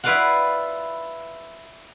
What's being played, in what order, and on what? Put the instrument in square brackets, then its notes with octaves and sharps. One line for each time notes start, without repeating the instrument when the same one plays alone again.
[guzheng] E4 F4 B4 D5 F5 F#5